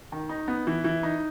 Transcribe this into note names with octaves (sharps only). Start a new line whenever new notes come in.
D#3
D#4
B3
E3
E3
D#4